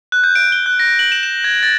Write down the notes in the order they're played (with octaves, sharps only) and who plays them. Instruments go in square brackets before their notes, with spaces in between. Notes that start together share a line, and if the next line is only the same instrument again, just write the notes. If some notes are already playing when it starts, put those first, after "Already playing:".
[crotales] F#6
G6
D7
G7
F#6
A#6
F#7
E7
E7
G#6
A6